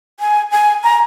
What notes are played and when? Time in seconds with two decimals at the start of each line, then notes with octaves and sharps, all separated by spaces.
0.20 G#5
0.52 G#5
0.83 A#5